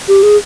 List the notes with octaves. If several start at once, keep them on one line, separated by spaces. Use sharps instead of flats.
G4
G#4